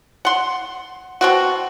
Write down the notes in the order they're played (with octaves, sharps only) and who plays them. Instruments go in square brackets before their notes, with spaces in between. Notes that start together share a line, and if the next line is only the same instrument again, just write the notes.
[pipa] F#5 C6
B2 C4 F#4